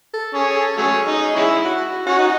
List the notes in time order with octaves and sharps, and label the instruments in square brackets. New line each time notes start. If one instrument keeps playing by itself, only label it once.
[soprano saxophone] A4
[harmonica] C#4 [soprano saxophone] G#4
[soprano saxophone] G#4
A4
[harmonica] F#3 A3 C#4 [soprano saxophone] G#4
[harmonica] D#4
G#3 C#4 E4
[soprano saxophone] F#4
[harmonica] C#4 [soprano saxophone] F#4
[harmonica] D#4